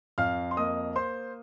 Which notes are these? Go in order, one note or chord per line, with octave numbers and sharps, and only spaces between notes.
F2 F5 F6
C6
A#3 D#5 D#6
C5 C6